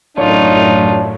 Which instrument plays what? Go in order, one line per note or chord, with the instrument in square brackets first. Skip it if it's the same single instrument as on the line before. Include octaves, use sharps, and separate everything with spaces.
[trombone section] A1 D4 [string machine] F#2 A2 [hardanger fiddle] D#4 F4 [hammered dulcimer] C#5